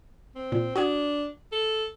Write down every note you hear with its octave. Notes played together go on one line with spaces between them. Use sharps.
C4
A#2
D4 F#4 D#6 G#6
A4